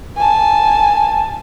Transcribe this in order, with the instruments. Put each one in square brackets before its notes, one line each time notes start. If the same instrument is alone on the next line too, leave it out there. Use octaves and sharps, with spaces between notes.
[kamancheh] G#5 A5